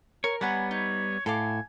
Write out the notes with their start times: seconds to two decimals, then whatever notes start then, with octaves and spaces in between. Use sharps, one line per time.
0.24 A#4 C#5
0.41 G3 B3 C#5 F#5 G#5 A#5
0.71 D#4 C#5
1.26 A2 A4 F5 G#5 D6